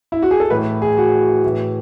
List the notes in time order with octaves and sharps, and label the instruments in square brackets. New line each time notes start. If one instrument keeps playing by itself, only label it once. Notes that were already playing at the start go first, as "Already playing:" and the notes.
[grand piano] E4
F#4
G#4
A4
A2 E3 B4
G#4
F#4
A2 E3